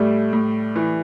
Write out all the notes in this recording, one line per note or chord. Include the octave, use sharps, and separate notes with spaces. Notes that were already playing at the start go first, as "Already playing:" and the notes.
Already playing: A2 G3 A3
A2
E3